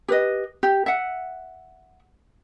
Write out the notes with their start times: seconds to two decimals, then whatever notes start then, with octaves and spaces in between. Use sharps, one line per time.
0.08 G4 B4 D#5
0.63 G4
0.86 E5 F#5